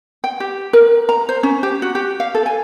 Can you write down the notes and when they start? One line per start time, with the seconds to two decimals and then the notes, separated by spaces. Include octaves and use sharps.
0.24 G5
0.40 G4
0.73 A#4
1.09 A#5
1.29 C5
1.43 C#4
1.63 G4
1.82 F#4
1.95 G4
2.20 F5
2.35 A4
2.46 G#5